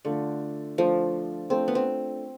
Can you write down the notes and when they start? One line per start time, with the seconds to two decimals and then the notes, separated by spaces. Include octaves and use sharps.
0.05 D3 A3 D4 F4
0.78 F3 A3 D4 F4
1.50 A3 C4 D4 F4
1.68 B3
1.75 C4